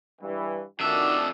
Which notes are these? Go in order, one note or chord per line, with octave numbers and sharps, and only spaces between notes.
G2 E3
F2 D#3 D4 F#4 E5